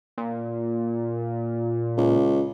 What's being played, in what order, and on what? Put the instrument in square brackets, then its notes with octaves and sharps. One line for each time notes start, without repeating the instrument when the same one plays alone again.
[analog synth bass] A#2
[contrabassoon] C#2